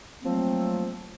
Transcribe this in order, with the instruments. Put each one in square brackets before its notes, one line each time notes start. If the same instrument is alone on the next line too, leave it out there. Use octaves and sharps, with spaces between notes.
[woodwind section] F3 F#3 A3 A#3 C4